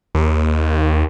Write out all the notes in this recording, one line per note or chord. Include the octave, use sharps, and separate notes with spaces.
D#2